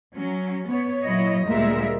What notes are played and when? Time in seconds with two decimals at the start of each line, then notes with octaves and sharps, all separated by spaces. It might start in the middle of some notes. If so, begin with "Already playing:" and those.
0.15 F#3 C#4
0.68 B3 C#5
1.03 A#2 F#3 E4 C#5 D#5
1.45 D2 A#2 G3 G#3 A#4 E5